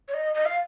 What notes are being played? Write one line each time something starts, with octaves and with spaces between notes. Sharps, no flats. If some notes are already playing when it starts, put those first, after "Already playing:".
C#5
D#5
D#5
F5